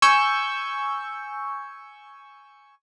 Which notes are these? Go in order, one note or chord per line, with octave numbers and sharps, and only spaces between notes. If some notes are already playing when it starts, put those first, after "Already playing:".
G#5 C#6 E6 G6